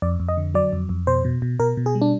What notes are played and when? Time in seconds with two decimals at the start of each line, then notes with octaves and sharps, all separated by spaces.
0.02 F2 D5
0.20 F2
0.29 D#5
0.37 D3
0.54 F#3 D5
0.73 F2
0.89 F2
1.07 B2 C5
1.25 B2
1.42 B2
1.59 B2 A#4
1.77 B2
1.86 G#4
1.95 G3
2.02 D4